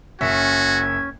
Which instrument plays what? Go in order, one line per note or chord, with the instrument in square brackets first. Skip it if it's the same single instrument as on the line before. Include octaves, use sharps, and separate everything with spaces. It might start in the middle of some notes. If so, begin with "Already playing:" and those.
[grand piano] F#1 E5 [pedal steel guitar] C#4 [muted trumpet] F#4 [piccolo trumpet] G#6